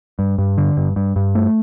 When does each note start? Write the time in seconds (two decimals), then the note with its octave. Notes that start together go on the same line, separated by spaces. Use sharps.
0.19 G2
0.38 G2
0.58 D3
0.77 G2
0.96 G2
1.16 G2
1.35 A3